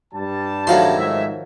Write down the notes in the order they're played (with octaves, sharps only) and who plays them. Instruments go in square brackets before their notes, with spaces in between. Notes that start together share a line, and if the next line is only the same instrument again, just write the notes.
[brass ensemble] G2 G3 A5
[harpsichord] A2 F5 C6 [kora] D#3 F3 F#3
[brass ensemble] G#2 E5